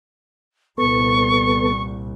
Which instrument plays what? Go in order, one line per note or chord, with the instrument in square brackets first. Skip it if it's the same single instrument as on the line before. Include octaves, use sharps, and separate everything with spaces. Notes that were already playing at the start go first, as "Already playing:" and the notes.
[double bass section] C2 A#2 [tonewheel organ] B3 A4 [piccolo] C#6